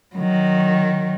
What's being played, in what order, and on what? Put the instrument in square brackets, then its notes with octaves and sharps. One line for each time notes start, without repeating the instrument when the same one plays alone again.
[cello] D#3 F#3